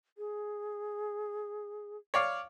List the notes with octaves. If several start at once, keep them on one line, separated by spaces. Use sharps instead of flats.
G#4
C#5 D5 F5